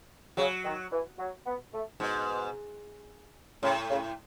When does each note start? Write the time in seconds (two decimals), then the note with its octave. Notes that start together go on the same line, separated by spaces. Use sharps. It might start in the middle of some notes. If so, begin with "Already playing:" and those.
0.37 C#3 F#3
0.64 D#3
0.91 E3
1.18 F#3
1.46 B3
1.73 A3
2.00 G#2 B2
3.62 A2 C#3
3.90 C#3